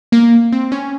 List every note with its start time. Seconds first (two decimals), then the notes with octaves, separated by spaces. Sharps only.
0.12 A#3
0.53 C4
0.72 C#4